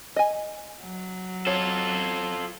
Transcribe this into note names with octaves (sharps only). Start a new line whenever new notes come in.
D#5 G#5
F#3
F4 A4 C#5